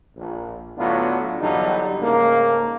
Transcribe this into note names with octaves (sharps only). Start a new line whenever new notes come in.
A#1
A2 D3 F#3 B3 D4 F4
E2 G2 D3 F#3 G3 D#4
G#2 C#3 A3 A#3